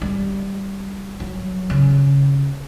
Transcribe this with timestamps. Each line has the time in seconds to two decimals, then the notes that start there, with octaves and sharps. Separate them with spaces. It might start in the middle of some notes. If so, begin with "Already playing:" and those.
0.02 G3
1.20 F#3
1.70 C#3